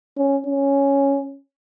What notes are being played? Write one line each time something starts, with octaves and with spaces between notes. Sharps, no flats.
C#4
C#4